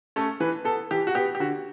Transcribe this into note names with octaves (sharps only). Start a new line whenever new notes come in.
A3 C#4
E3 B4
B3 A4
E3 G4
F#4
B3 G4
G4
D3 F#4